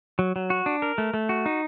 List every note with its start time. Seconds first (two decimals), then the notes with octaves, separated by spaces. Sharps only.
0.19 F#3
0.36 F#3
0.50 F#4
0.66 D4
0.82 A#4
0.98 A3
1.14 A3
1.29 F#4
1.46 D#4